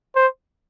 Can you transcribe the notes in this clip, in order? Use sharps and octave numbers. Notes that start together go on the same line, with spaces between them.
C5